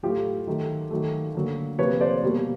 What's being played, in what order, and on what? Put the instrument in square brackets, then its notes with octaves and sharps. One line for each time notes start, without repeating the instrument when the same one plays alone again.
[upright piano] A2 F#3 A3 F4 G4
D#3 F#3 A3
D#3 F#3 A3
D3 F#3 A#3
C3 F3 A#3 B4 C#5
C5 D5
B2 G3 A#3